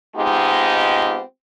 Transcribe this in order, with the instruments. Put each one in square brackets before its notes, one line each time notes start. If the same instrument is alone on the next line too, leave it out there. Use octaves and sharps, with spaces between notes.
[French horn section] G#3 B3 C4 D#4 F4 G4